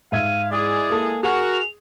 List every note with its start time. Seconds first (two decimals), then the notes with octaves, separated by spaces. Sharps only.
0.12 G#2 E5 F5 G#6 D#7
0.51 G#3 E4 G#4 D5 D#6
0.90 A#3 A4
1.23 F#4 G#4 A#4 F7